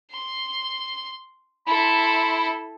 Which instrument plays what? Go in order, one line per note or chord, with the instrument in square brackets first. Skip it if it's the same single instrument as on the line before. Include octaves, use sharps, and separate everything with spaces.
[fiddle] C6
[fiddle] E4 A4 [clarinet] B5